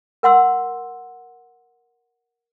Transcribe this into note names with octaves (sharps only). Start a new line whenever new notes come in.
A#4 F#5 C6 E6